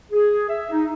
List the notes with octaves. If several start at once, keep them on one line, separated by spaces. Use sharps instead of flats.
G#4
E5
D#4